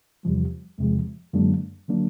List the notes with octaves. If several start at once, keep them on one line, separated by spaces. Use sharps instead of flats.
E2 C3 F3 G3
E2 C3 F3 G#3
F#2 D3 F#3 G#3 A#3 D4
D3 F#3 A#3 D4